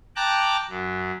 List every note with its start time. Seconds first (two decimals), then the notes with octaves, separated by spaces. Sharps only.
0.16 G5 A5 A#5 D6 F#6
0.69 F#2